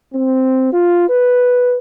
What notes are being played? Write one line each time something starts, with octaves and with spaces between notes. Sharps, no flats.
C4
F4
B4